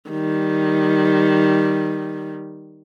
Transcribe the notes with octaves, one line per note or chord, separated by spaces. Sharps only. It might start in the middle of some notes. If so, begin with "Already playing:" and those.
D#3 G3